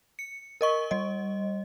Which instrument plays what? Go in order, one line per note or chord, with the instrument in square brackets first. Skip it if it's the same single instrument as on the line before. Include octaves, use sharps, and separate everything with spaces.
[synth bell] C#7
A#4 D#5 C#6
G3 D#5